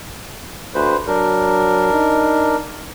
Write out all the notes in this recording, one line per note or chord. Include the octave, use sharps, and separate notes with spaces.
D2 B4 C5
F#3 D4 A#4
D#4